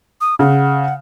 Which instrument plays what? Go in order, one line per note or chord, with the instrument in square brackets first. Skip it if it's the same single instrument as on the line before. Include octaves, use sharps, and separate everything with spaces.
[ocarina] D#6
[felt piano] C#3 [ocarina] F#5